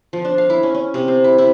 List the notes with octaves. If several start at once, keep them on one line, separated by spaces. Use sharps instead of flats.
F3
D4
F5
E4
C#4
C#4
C3
C4
E4
E4